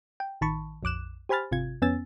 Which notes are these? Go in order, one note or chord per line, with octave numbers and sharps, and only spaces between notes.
G5
A1 D#3 A5 B5 C#6
A#1 F2 D6 F#6 E7
G4 C5 G#5 B5 F6 A6
G#1 C3 F4 G#6
F2 B3 C#4 G#5 E6 A6